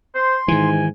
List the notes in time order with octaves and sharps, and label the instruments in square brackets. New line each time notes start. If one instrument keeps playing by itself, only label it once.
[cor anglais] C5 [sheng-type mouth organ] C6
[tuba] G#2 [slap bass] D#3 E3 [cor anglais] G#5